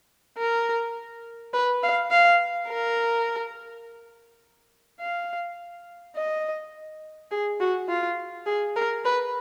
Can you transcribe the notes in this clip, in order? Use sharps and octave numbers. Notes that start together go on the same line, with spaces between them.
A#4
B4
F5
F5
A#4
F5
D#5
G#4
F#4
F4
G#4
A#4
B4